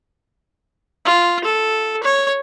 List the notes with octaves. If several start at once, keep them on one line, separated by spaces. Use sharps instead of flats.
F4
A4
C#5